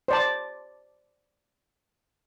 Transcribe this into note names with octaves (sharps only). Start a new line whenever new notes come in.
C5 D5 A5